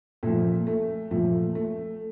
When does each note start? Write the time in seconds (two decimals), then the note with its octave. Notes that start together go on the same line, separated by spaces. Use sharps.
0.23 A#2 F3 A3
0.67 A3
1.11 A#2 F3 A3
1.55 A3